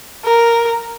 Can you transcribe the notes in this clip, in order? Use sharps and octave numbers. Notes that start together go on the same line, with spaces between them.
A#4